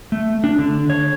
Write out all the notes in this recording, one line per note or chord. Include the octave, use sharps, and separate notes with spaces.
A3
D4
D3
C#5